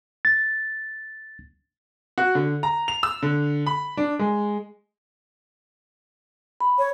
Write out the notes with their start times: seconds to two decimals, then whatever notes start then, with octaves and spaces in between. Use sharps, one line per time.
0.25 A6
2.18 F#4
2.35 D3
2.63 A#5
2.88 F7
3.03 E6
3.22 D3
3.66 B5
3.97 D4
4.19 G#3
6.61 B5
6.78 C#5